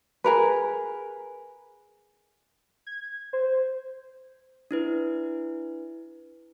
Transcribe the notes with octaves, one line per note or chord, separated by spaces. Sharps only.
G#4 A#4 B4
G#6
C5
D4 E4 B4